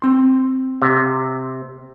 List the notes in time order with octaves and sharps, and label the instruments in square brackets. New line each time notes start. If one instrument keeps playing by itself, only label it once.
[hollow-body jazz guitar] C4 C6
[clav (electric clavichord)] C3